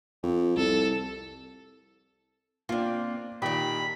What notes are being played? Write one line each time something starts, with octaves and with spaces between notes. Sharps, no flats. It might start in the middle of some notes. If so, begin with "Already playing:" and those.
F2
C2 A4
A#3 C4 D4 F4
A#2 D#3 D4 G4 B5